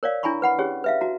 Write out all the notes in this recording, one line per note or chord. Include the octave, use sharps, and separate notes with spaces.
A#4 C#5 D5 F5
D4 E4 G#5 A#5 B5 C#6
B4 F#5 B5
C#4 G4 G#4 C#5
B4 E5 F5
F#4 A#5